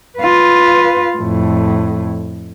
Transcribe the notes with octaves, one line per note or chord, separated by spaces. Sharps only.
F4 B4
F2 A2